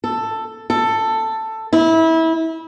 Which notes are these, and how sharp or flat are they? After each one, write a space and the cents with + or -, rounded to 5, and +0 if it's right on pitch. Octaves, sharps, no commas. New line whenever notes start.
A4 +10
A4 +10
E4 -25